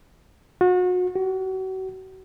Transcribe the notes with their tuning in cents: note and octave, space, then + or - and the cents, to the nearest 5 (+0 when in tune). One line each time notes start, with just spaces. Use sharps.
F#4 -35
F#4 +35